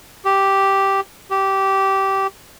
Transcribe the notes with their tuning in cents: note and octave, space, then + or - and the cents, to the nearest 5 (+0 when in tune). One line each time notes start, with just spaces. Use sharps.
G4 -5
G4 -15